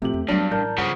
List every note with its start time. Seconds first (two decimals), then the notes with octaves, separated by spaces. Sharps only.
0.02 A2 C3 F3 A3 G4 F#7
0.13 E2
0.28 G2 F#3 B3 D4
0.52 A1 A#4 D5 A5 A#5 G6
0.78 G2 C#3 F3 F#5 D#6